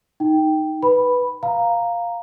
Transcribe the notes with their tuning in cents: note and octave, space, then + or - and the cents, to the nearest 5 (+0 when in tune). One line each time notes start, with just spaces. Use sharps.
D#4 +0 G5 +0
B4 +0 B5 -5
F5 +0 A#5 +0